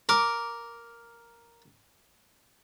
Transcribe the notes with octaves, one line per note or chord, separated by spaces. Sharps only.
A#4 D6